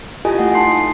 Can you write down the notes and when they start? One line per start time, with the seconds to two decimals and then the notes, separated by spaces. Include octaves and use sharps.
0.25 E4 F4 G4 A4 D#5 G#5
0.38 A3 F4 F#5
0.54 D#4 A5 C6 C7